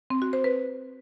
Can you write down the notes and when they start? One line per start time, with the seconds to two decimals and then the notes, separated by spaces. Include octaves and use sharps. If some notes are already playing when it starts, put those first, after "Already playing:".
0.10 C4
0.22 F#4
0.33 C5
0.44 B4